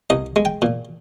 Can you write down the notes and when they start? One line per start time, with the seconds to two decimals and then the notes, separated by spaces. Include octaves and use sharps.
0.10 C2 D#5
0.36 G#3
0.45 G5
0.62 A#2